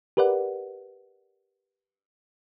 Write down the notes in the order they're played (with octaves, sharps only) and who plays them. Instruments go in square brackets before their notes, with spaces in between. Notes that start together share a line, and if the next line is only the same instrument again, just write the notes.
[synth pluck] G4 A#4 B4 D5 F#5